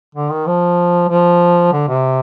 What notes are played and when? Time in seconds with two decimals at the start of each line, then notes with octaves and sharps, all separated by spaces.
0.15 D3
0.31 D#3
0.47 F3
1.09 F3
1.73 D3
1.89 C3